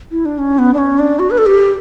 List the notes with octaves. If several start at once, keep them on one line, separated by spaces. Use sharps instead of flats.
E4
D4
C#4
B3
D4
C#4
D4
F#4
B4
A4
G4